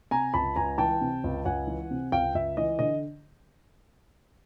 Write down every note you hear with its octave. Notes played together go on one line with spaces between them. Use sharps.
C3 G#5 A#5
C#2 A5 B5
C#2 G#5 A#5
E3 G5 A5
C3
C#2
C#2 F#5 G#5
E3
C3
C#2 F5 G5
C#2 E5
E3 D#5
D3 D#5